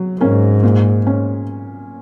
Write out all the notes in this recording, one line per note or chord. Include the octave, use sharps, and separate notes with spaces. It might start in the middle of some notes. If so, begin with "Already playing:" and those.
Already playing: F#3
G#2 A#3 C#4
A#2
C#4